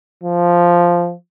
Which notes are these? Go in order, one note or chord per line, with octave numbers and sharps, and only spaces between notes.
F3